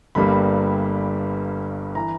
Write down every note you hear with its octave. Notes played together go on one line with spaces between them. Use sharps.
G1 G2 G3 A#3 B5
E3 A#5